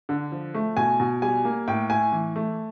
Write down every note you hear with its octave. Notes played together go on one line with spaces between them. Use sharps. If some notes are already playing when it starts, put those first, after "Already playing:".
D3
F3
A3
B2 G#5
B2
G3 G#5
A#3
A2 G5
A2 G#5
E3
A3